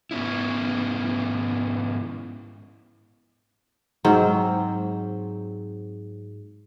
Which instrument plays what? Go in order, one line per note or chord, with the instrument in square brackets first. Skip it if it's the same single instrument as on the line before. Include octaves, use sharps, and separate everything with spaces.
[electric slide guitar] G#2 B3 C#4 E4
[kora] G#2 F#3 C4